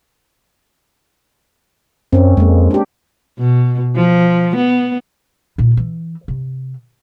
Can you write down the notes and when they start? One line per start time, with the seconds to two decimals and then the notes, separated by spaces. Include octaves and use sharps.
2.13 F#2 C4 C#4
2.37 F2 G#3 A#3
2.71 D4 G4
3.39 B2
3.96 F3
4.56 B3
5.58 A#2 E4
5.77 E3
6.28 C3